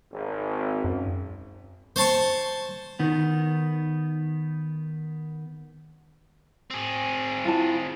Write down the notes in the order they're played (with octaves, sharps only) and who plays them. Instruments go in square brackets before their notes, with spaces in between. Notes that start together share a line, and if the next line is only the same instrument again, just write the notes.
[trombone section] G#1
[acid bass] F#2
[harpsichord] C5 C#5 A5 C6 C#6
[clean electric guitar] D#3 B3
[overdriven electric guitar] C4 G#4
[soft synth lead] E4 [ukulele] F4 A5